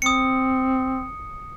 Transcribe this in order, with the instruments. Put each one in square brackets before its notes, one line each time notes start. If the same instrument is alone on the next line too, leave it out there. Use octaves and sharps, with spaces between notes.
[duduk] C4 [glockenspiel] D#6 C#7